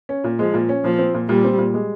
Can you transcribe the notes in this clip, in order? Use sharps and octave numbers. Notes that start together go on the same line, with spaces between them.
C#4
A#2
F3 G#3
A#2
C#4
A#2 F3
C4
A#2
A#2 G3
C4
A#2
G#3